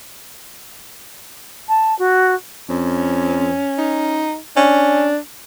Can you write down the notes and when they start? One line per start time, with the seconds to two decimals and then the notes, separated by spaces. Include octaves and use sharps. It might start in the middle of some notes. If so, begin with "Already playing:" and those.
1.68 A5
1.98 F#4
2.69 F2 C#4
3.78 D#4
4.56 C#4 D4